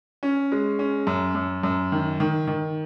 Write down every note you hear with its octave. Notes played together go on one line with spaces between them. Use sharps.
C#4
G#3
C#4
F#2
F#2
F#2
D#3
D#3
D#3